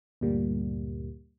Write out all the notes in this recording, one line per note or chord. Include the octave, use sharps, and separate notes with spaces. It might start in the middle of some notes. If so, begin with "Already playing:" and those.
D2 G2 A#2 G3 A#3